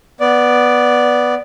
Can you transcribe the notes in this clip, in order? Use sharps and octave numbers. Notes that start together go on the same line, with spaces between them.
B3 D5